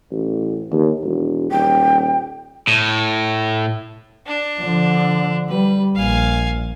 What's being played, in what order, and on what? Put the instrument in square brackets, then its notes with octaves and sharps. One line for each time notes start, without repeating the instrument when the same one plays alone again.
[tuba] A1
D#2
E1
[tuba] D#1 [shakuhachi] G5
[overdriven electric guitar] A2
[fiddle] D4
[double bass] D3 F3
[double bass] G3 [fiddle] B4
[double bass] A#1 [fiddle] F5 G#5